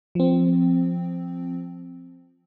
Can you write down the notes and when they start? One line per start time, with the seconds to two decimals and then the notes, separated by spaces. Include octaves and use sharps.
0.15 F3 C4